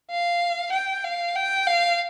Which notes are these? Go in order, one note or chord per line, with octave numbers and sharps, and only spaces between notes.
F5
G5
F5
G5
F5